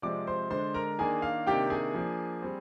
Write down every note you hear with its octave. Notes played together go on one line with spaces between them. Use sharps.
C3 F3 G#3 C4 D5 D6
C5 C6
D3 G#3 D4 C5 C6
A#4 A#5
D#3 A#3 D4 G#4 G#5
F5
C3 D#3 A#3 D4 G4 G5
G#4 G#5
F3 A#3 D4
G3 C4